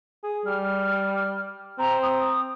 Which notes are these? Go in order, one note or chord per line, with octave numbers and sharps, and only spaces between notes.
G#4
G3 F6
C4 A#5
D#6